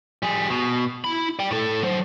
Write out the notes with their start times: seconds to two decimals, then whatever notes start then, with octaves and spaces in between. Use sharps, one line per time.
0.22 G3 G#4
0.50 B2
1.04 E4 B5
1.39 D5 G5
1.51 A2 A4
1.83 F#3 C5